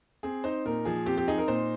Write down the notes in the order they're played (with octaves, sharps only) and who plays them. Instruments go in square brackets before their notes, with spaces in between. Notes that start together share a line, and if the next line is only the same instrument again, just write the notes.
[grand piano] C4 G#4
D#4 C5
A#2 A#4
F3 G#4
C4 G4
G4
D#4 G#4
A#4
A#2 C5